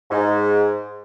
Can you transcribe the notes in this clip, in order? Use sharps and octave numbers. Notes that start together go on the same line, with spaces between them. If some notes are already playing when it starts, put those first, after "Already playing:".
G#2